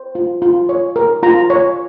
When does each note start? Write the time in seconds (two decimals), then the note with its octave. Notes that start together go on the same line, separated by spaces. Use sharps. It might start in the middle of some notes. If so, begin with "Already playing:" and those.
Already playing: C5
0.15 F4
0.42 F4
0.69 C#5
0.96 A#4
1.23 F4 A#5
1.50 C#5